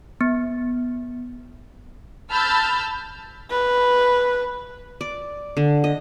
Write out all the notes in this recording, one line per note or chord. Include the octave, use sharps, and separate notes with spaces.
B3
A5 B5 E6 F6 G6 A6
B4
D5
D3
D#5